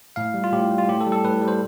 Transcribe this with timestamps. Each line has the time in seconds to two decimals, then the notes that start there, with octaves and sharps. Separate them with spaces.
0.16 A2 F5
0.34 G3
0.44 F4
0.52 A2 G4
0.71 G3
0.78 F4
0.88 A2 G4
1.01 A4
1.07 G3
1.12 A4
1.25 A2 B4
1.42 G3
1.48 C5